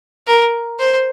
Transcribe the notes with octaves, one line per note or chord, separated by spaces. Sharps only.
A#4
C5